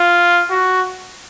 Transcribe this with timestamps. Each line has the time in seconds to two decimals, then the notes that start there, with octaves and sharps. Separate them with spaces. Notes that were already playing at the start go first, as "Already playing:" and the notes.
Already playing: F4
0.50 F#4